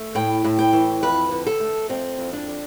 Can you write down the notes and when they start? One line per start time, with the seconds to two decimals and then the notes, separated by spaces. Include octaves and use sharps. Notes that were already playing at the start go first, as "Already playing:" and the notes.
Already playing: A3
0.15 A2 G5
0.44 A2
0.59 G5
0.73 E3
1.03 F2 B4
1.31 D3
1.47 A4
1.60 A3
1.89 F2 C4
2.18 F2
2.33 D4
2.48 D3